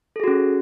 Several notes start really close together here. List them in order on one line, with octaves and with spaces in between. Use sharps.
A4 G#4 F#4 C#4